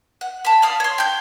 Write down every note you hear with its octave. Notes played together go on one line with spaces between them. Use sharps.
F#5
A5 B5
D5 F5 D#6
C#5 C6
G5 G6